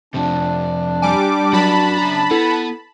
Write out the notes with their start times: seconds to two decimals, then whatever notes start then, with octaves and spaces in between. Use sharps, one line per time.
0.14 F2 C3 D4
1.02 G3 G#5 D6
1.53 F#3 F#4 A#4 A5 B5
1.98 C#3 A#5
2.31 B3 E4 A4